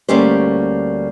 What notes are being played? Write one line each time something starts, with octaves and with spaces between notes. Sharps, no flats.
D2 G3 A#3 C#4 G4 C5